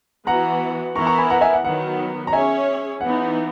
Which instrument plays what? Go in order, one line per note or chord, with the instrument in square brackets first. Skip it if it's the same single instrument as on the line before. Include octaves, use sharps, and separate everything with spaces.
[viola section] E3 B3 F#4 [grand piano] F#5 A#5
[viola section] E3 B3 E4 A#4 [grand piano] A#5 C#6
[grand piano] A#5 C#6
G#5 B5
F#5 A#5
E5 G#5
F#5
[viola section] D#3 F#3 B3 [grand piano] F#5
[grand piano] A#5
[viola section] C#4 G#4 C#5 [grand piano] E5 G#5
[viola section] E3 B3 D#4 [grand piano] F#5